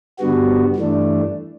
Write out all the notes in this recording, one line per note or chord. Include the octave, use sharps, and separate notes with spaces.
G2 D3 G3 B3 F#4
G2 E3 A3 D4